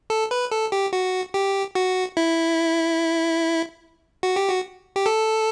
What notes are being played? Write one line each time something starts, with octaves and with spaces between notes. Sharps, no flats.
A4
B4
A4
G4
F#4
G4
F#4
E4
F#4
G4
F#4
G4
A4